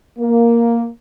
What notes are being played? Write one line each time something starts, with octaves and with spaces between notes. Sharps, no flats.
A#3